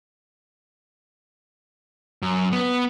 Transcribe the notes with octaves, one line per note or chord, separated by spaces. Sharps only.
F#2
B3